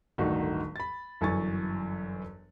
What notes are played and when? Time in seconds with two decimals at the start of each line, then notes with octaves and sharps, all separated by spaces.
0.18 D1 G1 D#3 A3 D#4 F#4
0.76 B5 A6
1.21 G1 F#2 E3 G#5 C#6 A6